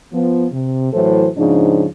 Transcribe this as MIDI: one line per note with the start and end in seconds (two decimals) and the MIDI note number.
0.13 0.46 53
0.13 0.46 59
0.52 0.91 48
0.93 1.28 45
0.93 1.28 52
0.93 1.28 54
0.93 1.28 69
0.93 1.28 72
1.37 1.85 44
1.37 1.85 49
1.37 1.85 53
1.37 1.85 62
1.37 1.85 63